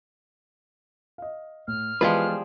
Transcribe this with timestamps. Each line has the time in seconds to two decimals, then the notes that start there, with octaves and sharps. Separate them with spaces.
1.18 D#5 F5
1.68 A2 F6
2.01 E3 F3 G3 G#3 B3 F4 G#4 B4